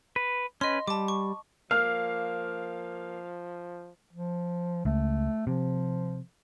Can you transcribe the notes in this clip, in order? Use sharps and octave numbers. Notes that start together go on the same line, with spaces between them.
B4
C#4 B4 D#5 C6
G3 A5 D6
C#6
F3 A#3 F5 F6
F3
C#2 A3
C3 F3